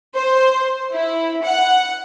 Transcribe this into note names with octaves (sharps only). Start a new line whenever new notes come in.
C5
E4
F#5